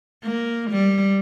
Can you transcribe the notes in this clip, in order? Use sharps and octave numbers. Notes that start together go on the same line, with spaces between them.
A#3
G3